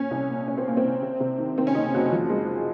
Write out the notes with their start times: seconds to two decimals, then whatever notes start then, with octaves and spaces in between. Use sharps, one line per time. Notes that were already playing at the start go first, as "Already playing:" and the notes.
Already playing: A#2 C#4
0.11 C2
0.29 A#2
0.48 A#2 C#4
0.57 C4
0.65 A#2 A#3
0.77 C4
0.84 C2
1.02 C3
1.20 C3
1.38 D#3
1.58 D#3 C4
1.67 C#4
1.75 F#1 D#4
1.94 F#1 F#4
2.12 F3
2.30 G#3